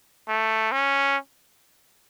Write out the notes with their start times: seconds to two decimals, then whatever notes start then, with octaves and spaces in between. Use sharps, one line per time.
0.28 A3
0.72 C#4